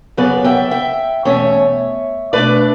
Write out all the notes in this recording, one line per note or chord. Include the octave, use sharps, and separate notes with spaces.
F#2 C#3 F#3 B3 B4 D5
E5 G5
E5 G5
E2 B2 A3 C#4 C#5 E5
B2 A3 D4 B4 D5